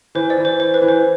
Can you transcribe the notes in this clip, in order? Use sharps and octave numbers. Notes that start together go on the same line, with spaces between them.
E3 C5
D5
E3
C5
E3 C5
B4
E3
C5